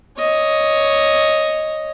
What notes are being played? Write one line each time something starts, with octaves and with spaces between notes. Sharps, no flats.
C#5 D#5